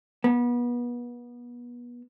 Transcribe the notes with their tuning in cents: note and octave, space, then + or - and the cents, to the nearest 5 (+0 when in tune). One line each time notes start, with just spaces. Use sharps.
B3 -30